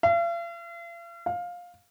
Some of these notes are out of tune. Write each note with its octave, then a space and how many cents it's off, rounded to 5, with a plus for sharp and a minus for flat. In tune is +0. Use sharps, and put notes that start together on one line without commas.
F5 -45
F5 +15